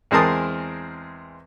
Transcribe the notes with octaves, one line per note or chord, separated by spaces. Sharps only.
E2 G#3 C4 A#4 A5 D#6